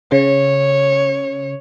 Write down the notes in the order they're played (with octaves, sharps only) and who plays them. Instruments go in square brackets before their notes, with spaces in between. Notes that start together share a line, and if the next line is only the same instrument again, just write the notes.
[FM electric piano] C#3 [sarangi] C#5